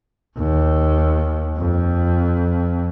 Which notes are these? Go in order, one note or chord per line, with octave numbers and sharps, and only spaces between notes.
D#2
F2